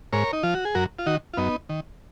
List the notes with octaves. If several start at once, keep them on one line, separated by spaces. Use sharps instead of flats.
G#2 A#4 C#5
D#4
F3 F4
F#4
G#4
F#2 F#4 A#4
F4
D#3 D#4 F#4
F4
F#2 B3 D#4
D#3